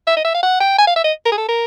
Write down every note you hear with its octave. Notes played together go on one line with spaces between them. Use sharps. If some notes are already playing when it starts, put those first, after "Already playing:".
E5
D#5
E5
F5
F#5
G5
G#5
F5
E5
D#5
A#4
G#4
A4
A#4